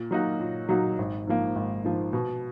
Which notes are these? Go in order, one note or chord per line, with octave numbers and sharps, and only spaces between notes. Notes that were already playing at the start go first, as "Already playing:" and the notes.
Already playing: A#2
F#3 A#3 D#4 F#4
A#2
F#3 A#3 D#4 F#4
G#1
G#2 F3 A#3
G#1
G#2 F3 A#3
B2